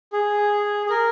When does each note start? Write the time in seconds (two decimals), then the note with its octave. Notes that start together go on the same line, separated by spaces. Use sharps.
0.13 G#4
0.86 G#4
0.90 A#4